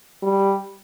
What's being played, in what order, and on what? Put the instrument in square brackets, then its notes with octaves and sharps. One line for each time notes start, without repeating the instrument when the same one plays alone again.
[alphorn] G3